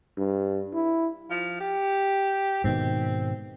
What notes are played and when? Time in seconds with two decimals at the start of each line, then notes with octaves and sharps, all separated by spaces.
0.17 G2
0.73 E4
1.30 F3
1.60 G4
2.64 G#2 B2 D#3 C4